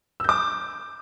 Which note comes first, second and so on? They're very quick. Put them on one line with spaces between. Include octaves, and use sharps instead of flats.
E6 G6 D6